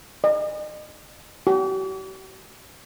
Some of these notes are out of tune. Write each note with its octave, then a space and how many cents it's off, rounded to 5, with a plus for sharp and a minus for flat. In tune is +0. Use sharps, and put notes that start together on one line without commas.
D#5 -40
G4 -45